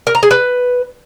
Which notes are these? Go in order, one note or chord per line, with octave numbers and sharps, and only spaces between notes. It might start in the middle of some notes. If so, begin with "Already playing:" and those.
A#4
A#5
G#4
B4